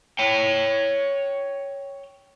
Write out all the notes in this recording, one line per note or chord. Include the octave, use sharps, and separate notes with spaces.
C#5 G5